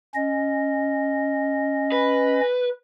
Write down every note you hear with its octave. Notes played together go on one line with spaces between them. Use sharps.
C#4 D#5
B4